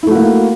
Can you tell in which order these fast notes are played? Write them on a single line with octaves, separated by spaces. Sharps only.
E4 A3 F#4 A#3